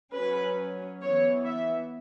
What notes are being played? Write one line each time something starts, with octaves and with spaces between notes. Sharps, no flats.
F#3 C#4 B4
E3 B3 C#5
E5